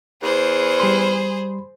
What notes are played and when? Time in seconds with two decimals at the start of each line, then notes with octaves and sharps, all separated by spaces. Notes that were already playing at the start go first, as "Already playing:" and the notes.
0.22 E2 G#4 C5
0.80 G3 B5 C6